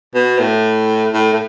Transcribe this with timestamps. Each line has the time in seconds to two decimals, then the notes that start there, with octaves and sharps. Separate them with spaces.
0.14 B2
0.39 A2
1.13 A2
1.33 A2